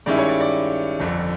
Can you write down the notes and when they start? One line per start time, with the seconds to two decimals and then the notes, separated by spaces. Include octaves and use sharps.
0.06 G2 D#3 G#3 C#4 E4 D5
0.18 C#5
0.29 D5
0.40 D5
1.00 G1 F2 D3